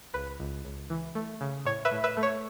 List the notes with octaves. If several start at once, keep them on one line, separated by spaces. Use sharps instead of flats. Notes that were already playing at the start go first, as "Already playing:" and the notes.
C#2 B4
C#2
C#2
E3
A3
C#3
A2 C#5
B4 E5
A2
B4 E5
A3
C#5